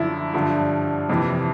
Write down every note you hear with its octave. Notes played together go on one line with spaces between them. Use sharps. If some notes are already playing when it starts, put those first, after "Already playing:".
Already playing: F#2 D3 F3 E4
G2 D3 F3
F2 C3 E3